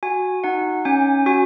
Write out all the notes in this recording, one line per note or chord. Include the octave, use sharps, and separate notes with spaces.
F#4 G#5
D#4 F#5
C#4 G#5
F#4 G#5